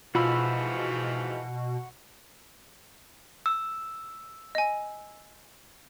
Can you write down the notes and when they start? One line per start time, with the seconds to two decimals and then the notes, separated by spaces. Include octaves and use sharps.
0.15 G#2 B2 E3 F3 F4 F#4 B5 E6
3.46 E6
4.55 D#5 G#5